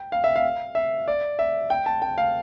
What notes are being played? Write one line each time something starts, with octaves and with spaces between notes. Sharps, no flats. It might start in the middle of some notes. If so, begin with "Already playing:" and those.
Already playing: G5
F5
E5
F5
E5
D5
E5
G5
A5
G5
F5